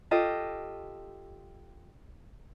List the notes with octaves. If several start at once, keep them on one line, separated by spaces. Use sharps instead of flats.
F4 G4 A4 D#5